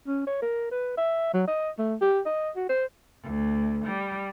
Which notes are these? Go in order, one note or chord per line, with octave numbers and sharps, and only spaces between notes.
C#4
C#5
A#4
B4
E5
F#3
D#5
A3
G4
D#5
F#4
C5
D2
G3